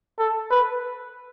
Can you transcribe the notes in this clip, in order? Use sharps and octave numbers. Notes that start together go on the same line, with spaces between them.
A4
B4